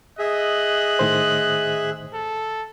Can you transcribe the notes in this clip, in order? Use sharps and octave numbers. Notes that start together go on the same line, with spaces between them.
G#4 D#5 E5 F#6
A2 D#3 C5
A4